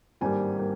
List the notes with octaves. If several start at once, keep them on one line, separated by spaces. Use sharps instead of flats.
G#1 G2 G3 A#3 G#5
G3 A#3